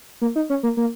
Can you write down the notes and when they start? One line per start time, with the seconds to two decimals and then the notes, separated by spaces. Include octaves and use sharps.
0.21 A#3
0.36 D#4
0.50 C#4
0.63 A#3
0.77 A#3